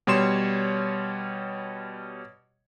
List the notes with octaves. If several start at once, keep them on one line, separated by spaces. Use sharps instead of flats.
B2 G3 C#5 C6 E7